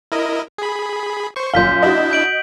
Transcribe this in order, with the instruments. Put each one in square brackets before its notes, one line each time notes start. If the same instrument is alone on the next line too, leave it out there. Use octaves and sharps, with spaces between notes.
[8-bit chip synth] E4 A#4 D#5
G#4 B5
C5 C#6
[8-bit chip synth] G1 [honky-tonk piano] F#2 A#2 F5 [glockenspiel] G6 B6 G7
[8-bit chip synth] D4 E4 [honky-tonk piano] F#4 D#5
[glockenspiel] G6 D7 F#7